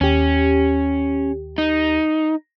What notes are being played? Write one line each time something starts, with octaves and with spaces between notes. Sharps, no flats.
D#2 C#4 G4
D#4